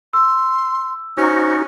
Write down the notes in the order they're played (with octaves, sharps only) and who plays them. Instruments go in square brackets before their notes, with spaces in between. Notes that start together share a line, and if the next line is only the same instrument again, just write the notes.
[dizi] C6 [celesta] E6
[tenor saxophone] C#4 [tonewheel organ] D#4 F#4 [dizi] C5